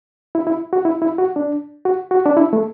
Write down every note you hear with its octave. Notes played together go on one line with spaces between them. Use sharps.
E4
E4
F#4
E4
E4
F#4
D4
F#4
F#4
D4
E4
A3